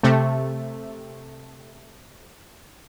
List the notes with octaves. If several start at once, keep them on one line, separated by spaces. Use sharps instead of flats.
C3 A3